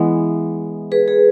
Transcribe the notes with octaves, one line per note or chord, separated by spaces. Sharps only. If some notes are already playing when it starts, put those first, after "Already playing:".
Already playing: E3 G#3 B3
G#4 B4
G#4